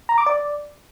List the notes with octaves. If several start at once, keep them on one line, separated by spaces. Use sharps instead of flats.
A#5
D6
D5